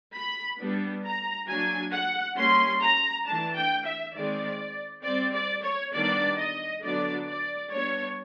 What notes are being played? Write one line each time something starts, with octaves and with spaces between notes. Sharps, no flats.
B5
G3 B3 D4
A#5
F#3 A#3 D4 G#5
F#5
G3 A#3 C#4 C6
A#5
E3 A3 D4 A5
G5
E5
D#3 G#3 C4 D5
G3 C4 D5
D5
C#5
D#3 G3 B3 D4 D5
D#5
D3 F#3 B3 D4 D5
D5
G3 B3 D4 C#5